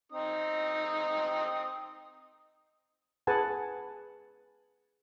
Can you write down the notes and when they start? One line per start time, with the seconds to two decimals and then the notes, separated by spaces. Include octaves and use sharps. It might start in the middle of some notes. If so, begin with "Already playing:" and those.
0.12 C4 D#4 D#6
3.27 G#4 B4 F#5 G#5 A5